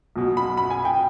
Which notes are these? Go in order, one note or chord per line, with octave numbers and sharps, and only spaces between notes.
B1 B2
B5
B5
G#5
G5